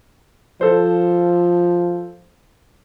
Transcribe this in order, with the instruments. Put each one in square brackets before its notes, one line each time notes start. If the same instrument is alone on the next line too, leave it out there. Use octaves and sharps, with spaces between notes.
[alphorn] F3 [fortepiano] A4 C5